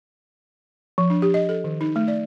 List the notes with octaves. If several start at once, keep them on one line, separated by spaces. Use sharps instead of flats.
F3
D4
G4
D#5
A4
D#3
D#4
A3
D5